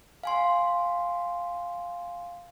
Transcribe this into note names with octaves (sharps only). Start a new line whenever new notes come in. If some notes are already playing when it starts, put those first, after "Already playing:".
F5 G#5 C6